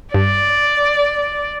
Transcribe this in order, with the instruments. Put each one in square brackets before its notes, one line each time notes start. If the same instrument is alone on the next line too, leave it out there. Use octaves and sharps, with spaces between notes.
[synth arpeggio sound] G2 [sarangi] D5